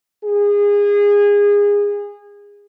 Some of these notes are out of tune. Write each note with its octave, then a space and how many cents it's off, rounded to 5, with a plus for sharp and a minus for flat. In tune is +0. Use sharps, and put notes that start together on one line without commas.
G#4 -25